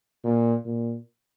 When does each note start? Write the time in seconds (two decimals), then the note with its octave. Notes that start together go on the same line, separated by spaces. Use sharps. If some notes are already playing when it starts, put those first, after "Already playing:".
0.24 A#2
0.65 A#2